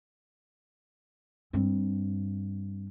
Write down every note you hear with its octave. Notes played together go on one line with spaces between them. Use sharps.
G2 C4